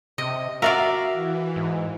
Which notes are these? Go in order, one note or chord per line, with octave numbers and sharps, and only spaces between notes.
C3 D#5
F#4 A#4 D5 E5 F5
E3
G#2